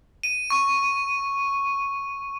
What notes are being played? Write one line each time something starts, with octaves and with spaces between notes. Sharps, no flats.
D#7
C#6